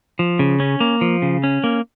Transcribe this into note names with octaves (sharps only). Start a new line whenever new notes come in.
F3
C#3
C#4
A#3
F3
C#3
C#4
A#3